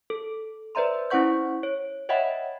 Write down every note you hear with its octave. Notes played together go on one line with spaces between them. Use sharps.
A4
B4 C5 D5 E5 A#5 C6
C#4 E4 C5 F#5 C#6 G6
C#5
C#5 D#5 E5 F#5 G5 B5